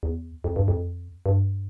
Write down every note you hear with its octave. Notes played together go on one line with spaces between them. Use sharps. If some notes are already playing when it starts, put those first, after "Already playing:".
E2
F2
G2
F2
G2